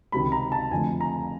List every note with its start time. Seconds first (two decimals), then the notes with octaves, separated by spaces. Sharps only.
0.12 C#2 C3 D#3 B5
0.32 A#5
0.52 A5
0.71 F2 D3 F3 A3 G#5
1.01 A#5